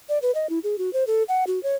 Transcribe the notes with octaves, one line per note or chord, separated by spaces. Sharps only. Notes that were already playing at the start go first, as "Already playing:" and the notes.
D5
B4
D#5
E4
G#4
F#4
C5
A4
F#5
F#4
C#5